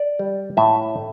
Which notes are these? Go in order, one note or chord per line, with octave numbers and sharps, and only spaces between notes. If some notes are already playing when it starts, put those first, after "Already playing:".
Already playing: D5
G3
A2 E5
A3